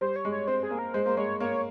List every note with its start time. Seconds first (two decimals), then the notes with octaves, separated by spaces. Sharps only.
0.01 G3 C5
0.16 C#5
0.25 G#3
0.31 C#5
0.48 C4 C5
0.63 G#4
0.70 A#3
0.79 A#4
0.94 G#3 C5
1.06 A#3
1.17 G#3 C#5
1.40 A#3 C#5